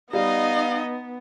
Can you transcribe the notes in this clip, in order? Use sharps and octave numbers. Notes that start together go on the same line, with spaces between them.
G3 B3 D#4 D#5 F5